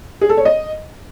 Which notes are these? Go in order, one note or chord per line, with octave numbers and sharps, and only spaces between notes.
G#4
A4
C#5
D#5